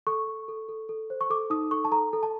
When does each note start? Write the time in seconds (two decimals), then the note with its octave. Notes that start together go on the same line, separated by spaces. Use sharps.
0.07 A4 C#6
0.27 A4
0.48 A4
0.69 A4
0.89 A4
1.10 C5
1.21 C#6
1.30 A4 D6
1.50 D#4 D#6
1.71 A4 C#6
1.85 A5
1.91 A4 A#5
2.13 A4
2.23 A5